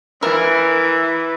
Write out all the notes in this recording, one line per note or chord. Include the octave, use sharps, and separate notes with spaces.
E3 A#4 E5